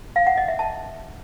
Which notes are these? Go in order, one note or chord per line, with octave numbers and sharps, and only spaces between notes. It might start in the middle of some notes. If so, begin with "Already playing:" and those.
F5
F#5
D#5
E5
A5